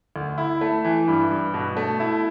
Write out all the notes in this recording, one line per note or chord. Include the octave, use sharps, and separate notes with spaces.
D2
E4
A3
E3
G2
G2
B2
A3
E4